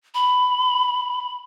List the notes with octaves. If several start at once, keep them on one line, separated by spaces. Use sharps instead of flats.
B5